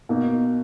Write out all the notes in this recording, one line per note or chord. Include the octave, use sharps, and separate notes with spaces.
B2 A#3 D#4